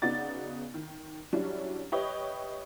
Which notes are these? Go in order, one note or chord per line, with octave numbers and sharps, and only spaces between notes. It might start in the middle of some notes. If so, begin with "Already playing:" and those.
C#3 B3 D#4 F#4 D5 A6
D#3
F#3 G3 C#4 D4 E4
G4 B4 C#5 D#5 E5